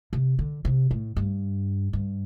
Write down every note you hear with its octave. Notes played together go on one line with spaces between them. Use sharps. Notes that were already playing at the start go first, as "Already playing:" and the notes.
C3
D3
C3
A2
G2
G2